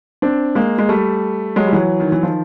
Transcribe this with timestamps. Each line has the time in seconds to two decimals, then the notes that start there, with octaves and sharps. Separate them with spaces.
0.22 C4 D4
0.55 G#3 A#3
0.78 G#3
0.89 G3 A3
1.56 F#3 G#3
1.66 G3
1.72 E3 F#3
2.00 D#3
2.12 E3
2.23 D#3 F3